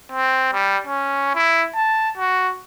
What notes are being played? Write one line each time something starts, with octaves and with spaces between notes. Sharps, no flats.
C4
G3
C#4
E4
A5
F#4